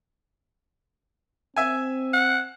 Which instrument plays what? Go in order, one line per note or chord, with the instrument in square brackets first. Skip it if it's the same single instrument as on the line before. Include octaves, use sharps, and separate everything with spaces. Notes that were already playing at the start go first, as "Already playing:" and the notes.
[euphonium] C4 [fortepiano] E5 G#5
[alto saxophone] F#5